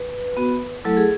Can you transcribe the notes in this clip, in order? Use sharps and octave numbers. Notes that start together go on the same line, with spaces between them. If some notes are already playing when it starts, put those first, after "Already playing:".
Already playing: B4
B3 F#4
F#3 A3 E4 A4
G#4